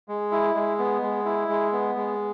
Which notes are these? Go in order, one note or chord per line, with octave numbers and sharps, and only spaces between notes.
G#3
E4
G#3
B3
G#3
E4
G#3
B3
G#3